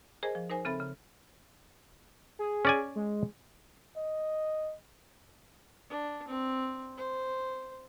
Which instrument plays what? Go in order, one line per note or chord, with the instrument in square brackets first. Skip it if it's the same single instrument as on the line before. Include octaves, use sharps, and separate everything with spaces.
[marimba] G#4 A#4 C5 D#5 G#5
F3
D#4 A#4 C5 G#5
C#3 C4 A4 E5 B5
C#3
[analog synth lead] G#4
[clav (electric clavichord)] C#4 D5 G#5
[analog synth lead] G#3
[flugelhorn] D#5
[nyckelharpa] D4
C4
C5